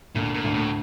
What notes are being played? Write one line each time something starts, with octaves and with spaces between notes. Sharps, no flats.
D2 A#2
A#2
D2
A2